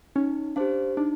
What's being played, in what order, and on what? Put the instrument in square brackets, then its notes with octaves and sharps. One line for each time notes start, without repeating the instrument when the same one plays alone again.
[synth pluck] C#4 [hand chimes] D#4
[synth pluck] D4 [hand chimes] G4 C5 F5
[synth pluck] D4 [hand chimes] D#4